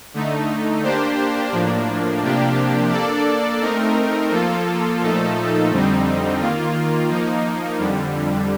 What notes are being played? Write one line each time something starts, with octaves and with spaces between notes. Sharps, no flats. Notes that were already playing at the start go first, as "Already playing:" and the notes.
D3 A3 D#4
A#3 D4 G4 C5
A2 F3 A#3 D4
C3 F3 A#3 D4 G4
A#3 D4 A4 D5
A3 C4 D#4 A#4
F3 A#3 F4 A4
A#2 F3 A3 D#4 A4
F2 D3 G3 C4 D#4
D#3 A#3 F4
F3 A#3 D#4
F2 D3 G3